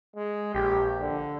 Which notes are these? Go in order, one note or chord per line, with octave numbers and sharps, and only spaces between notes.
G#3
A#1 G4
D3